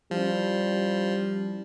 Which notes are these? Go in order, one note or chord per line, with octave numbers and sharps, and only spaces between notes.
F3 G3 C#4 E4